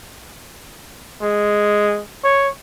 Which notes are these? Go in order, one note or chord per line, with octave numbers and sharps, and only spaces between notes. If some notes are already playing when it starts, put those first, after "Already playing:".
G#3
C#5